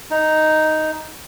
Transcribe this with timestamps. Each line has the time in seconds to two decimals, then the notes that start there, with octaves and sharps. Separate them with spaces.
0.11 D#4